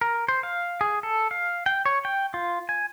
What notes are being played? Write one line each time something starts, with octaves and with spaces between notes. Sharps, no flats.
A#4
C5
F5
G#4
A4
F5
G5
C#5
G5
F4
G#5